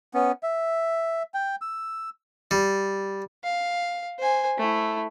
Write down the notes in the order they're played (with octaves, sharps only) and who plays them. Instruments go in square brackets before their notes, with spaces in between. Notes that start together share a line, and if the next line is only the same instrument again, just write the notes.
[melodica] B3 C#4
E5
G5
E6
[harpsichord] G3
[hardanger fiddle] F5
C5 G#5
A3 E4